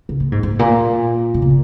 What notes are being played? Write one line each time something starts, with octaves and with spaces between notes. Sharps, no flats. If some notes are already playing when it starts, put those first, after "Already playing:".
C#3
A#2
G#2
G#2
A#2
B2
C#3